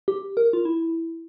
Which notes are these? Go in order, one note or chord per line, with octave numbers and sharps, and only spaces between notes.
G4
A#4
F4
E4